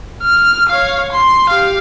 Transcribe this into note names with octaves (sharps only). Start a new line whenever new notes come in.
F6
C#5 F5
C6
G4 F5